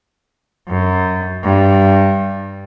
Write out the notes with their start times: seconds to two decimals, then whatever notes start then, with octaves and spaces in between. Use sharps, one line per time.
0.68 F#2
1.43 G2